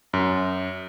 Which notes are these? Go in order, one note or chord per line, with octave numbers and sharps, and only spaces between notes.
F#2